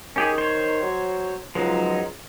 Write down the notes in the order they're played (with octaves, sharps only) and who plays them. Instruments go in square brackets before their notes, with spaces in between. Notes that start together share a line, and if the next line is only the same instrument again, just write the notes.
[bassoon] D#3 [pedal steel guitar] C#4 G4 G#4
[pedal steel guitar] C5 C#5
[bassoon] F#3
[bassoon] C#2 [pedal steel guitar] F3 F#3 D#4